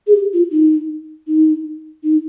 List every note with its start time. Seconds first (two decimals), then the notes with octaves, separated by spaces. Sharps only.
0.07 G#4
0.13 G4
0.33 F4
0.52 D#4
1.28 D#4
2.03 D#4